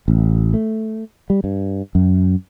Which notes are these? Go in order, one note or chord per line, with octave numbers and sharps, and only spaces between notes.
A1
A3
G3
G2
F#2